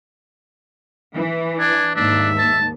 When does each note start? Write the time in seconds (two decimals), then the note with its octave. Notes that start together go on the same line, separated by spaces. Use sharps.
1.15 E3
1.59 D4 G#5
1.96 D#2 G#2 D4 E5
2.38 A5